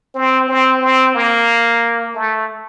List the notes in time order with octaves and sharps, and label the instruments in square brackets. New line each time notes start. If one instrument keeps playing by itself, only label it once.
[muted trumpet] C4
C4
C4
A#3
A3